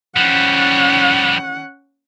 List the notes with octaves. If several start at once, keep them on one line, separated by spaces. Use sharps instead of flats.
F3 G3 C#4 F#5